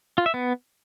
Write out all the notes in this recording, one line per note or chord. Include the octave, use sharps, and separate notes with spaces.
F4
E5
B3